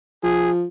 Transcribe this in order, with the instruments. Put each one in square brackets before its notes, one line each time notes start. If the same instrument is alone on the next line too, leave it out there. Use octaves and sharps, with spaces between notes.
[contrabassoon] F3 [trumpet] G#4